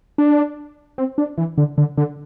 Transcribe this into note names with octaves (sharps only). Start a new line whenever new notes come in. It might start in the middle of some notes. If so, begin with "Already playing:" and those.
D4
C4
D4
E3
D3
D3
D3